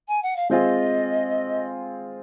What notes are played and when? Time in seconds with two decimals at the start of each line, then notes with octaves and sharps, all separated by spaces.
0.08 G#5
0.23 F#5
0.36 F5
0.50 G#3 C4 F4 G#4 C5 D#5